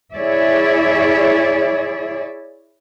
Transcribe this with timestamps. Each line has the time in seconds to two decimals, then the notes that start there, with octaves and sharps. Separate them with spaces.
0.14 E4 G#4 C#5 D5 E5